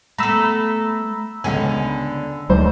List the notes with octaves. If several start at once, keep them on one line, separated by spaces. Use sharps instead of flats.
A3 B3 A#5 B5 E6
C#2 D3 B3 C#4 G#5
D2 G#2 F#3 G3 C5